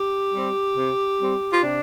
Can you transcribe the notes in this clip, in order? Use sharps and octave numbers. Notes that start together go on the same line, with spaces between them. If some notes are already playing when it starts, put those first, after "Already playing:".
Already playing: G4
G3 C4
C3
G3 C4
F4
C3 D4